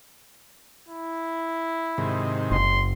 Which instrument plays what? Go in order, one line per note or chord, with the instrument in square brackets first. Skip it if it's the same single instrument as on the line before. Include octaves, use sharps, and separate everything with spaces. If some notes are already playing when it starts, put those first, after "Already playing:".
[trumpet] E4
[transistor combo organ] G#2 C3 D#3
[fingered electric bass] F#1 [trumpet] C6